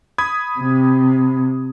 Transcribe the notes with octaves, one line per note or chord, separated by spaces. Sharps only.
B5 D#6 G#6
C3